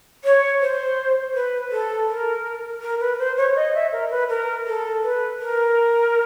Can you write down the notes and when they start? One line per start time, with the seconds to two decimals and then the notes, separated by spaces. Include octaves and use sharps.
0.24 C#5
0.61 C5
1.34 B4
1.71 A4
2.08 A#4
2.81 A#4
3.00 B4
3.18 C5
3.37 C#5
3.55 D#5
3.74 E5
3.92 A#4
4.10 B4
4.29 A#4
4.66 A4
5.02 B4
5.40 A#4